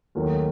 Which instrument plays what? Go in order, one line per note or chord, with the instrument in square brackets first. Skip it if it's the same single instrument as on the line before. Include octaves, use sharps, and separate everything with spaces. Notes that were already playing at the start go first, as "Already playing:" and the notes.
[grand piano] D#2 D#3 F#3 A3